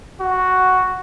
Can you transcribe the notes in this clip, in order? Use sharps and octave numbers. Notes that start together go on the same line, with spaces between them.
F#4